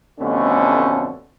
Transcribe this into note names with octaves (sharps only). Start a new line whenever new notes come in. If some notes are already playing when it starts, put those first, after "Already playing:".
A1 F2 B2 D3 A3 C#4